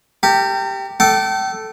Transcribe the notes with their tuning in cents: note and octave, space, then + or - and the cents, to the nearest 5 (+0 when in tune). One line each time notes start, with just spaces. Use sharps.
G4 +0 A#4 -45
A4 +0 G5 -35 D6 +15